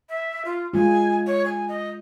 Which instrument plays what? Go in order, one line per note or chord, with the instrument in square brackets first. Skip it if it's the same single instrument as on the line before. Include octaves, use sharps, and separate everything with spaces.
[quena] E5
F4
[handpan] G#3 F4 [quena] G#5
[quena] C#5
G#5
D#5